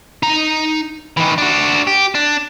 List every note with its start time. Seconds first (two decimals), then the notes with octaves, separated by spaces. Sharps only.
0.23 D#4 A#5
1.17 D#3 E3
1.38 D4 F#4
1.87 G4
2.15 D4